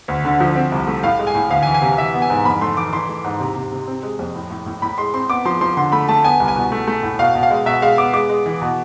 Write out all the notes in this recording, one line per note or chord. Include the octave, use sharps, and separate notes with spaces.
D2
D3
F3
C4
C2
A3
A2 F5
G#3
G#5
A2
D2 F5
G#5
E3
G#5
C3
E3 E5
B3
G#5
G#2
F2 B5
A3 C6
E3 D6
E3 C6
A3
G#2
C3
C3
C3
C4
G#3
F2
A2
A2
A2
A2 B5
G#3 C6
C4 C6
B3 D6
F3 C6
F3 C6
D3 C6
A3 B5
A3 A5
B3 G#5
C2
G#5
B2
A3
A3
A2
B2 F5
B2
F5
G#3
B2 E5
G#3 F5
B3 D6
G#3 D6
G#3
E3
B2